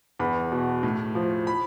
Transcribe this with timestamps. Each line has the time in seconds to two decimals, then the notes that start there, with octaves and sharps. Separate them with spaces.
0.19 E2 B5
0.52 B2
0.83 A2
1.15 F3
1.47 B5